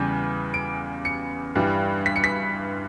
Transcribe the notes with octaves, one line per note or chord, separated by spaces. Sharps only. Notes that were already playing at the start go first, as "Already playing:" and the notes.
Already playing: E2 C#3 G3 G6
D7
C#7
G2 E3 G3
B6
C#7
B6